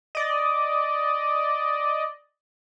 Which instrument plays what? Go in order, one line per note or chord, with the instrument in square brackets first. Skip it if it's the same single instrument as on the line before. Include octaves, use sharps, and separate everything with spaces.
[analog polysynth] D5 D#5